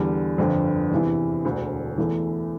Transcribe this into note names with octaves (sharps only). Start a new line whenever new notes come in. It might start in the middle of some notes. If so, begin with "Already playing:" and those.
Already playing: E2 D3 G3
G1 F2 D3
E2 C3 E3
E1 D2 D3
E2 E3 A3